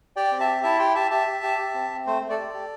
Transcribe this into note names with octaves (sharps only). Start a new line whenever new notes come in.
G4 D5 G5
C4
E5 A5
G4
E4 E5 A5
G4 G5 C6
G4 E5 A5
G4 E5 A5
G4
G4
G4
C4
C4
A3 C5
A3
A4 D5
G4
G4